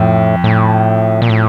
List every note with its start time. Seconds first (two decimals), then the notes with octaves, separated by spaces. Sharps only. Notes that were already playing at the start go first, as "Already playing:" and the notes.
Already playing: F2 A2
0.44 A2
1.22 A#2
1.30 A2